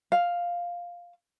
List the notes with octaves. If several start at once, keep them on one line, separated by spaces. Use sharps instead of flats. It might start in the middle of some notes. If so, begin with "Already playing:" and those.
F5